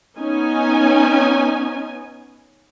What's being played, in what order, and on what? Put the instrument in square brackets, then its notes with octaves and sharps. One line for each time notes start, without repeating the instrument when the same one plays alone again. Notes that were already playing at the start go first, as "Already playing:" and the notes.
[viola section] B3 C#4 D#4 G#5